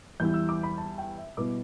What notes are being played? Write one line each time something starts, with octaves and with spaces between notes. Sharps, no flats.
E2 E3 G3 E4 G6
E6
D6
B5
A5
G5
E5
B2 G3 B3 E4 D6